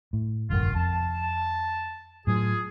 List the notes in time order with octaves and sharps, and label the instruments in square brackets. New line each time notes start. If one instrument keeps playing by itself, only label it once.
[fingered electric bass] A2
[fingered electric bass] F1 A#1 G2 [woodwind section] D3 D#3 F4
[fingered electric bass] F2 [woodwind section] A5
[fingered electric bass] A2 F#3 [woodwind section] F4 G#4